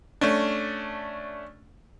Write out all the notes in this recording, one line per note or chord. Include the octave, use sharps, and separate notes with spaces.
A3 C#4 D4